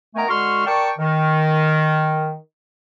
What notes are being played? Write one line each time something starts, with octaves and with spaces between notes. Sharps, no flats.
D#3 A3 B3 A#4 G#5 A#5
D3 G#3 F#4 C6 C#6 F6
A#4 D5 G5 A5 C#6
D#3